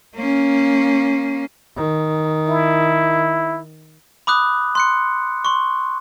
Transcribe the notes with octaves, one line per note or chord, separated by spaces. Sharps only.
A#3 C#4
D#3
E4
B5 D6 D#6 F#6
C6 F#6 C#7
C6 C#6